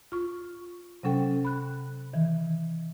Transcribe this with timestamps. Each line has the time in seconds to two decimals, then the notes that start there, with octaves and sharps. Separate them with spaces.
0.12 F4 C#6
1.03 C3 F#3 C#4 A4 G5
1.45 B5 F#6
2.13 D#3 E3